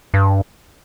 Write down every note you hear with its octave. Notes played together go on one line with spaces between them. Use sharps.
G2